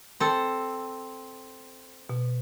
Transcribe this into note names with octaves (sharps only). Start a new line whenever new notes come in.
C4 A4
B2